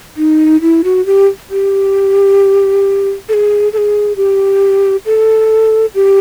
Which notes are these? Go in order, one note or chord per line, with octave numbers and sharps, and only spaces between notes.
D#4
E4
F#4
G4
G4
A4
G#4
A4
G#4
G4
A4
G4